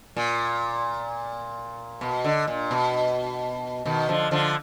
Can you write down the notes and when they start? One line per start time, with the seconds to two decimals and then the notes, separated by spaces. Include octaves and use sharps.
0.17 A#2
2.01 B2
2.24 D3
2.48 A#2
2.71 B2
3.86 B2 D#3
4.09 D3 F3
4.31 D3 F3